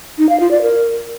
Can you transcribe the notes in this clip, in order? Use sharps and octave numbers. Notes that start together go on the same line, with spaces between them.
D#4
F5
F4
D5
A#4